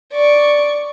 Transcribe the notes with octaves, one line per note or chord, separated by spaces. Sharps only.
D5 C#6